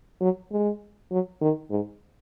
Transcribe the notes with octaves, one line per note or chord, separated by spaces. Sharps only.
F#3
G#3
F#3
D#3
G#2